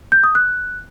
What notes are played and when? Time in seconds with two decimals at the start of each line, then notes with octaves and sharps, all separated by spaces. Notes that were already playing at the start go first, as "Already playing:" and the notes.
0.12 G6
0.24 D#6
0.35 F#6